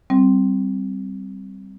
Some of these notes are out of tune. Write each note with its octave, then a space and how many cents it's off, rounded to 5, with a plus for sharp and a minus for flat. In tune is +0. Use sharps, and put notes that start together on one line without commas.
G3 -10 C4 +0